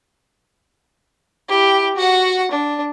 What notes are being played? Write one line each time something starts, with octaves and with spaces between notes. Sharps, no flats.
E4 G4
F#4 F#5
D4